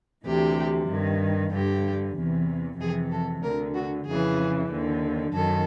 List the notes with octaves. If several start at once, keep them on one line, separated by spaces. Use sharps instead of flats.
D2 C3 E3 G4
G2 D#3
G2 D3 G4
E2 C3 E3
F2 C3 E3 G#4
A4
D2 D3 A#4
F#4
F2 C#3 E3 G#4
D#2 D3
F#2 D#3 A4